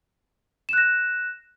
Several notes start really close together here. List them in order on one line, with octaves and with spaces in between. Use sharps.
E7 F#6 A#6